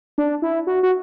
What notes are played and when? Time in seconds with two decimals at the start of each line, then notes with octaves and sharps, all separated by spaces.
0.18 D4
0.42 E4
0.67 F#4
0.83 F#4